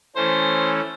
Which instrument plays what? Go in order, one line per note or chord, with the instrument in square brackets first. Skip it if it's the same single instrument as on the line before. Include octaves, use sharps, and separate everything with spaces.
[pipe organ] E3 A3 C#4 [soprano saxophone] C5